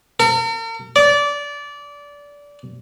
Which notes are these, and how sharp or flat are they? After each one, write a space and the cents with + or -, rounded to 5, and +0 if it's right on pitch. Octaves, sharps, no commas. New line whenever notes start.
A#4 -45
D5 -20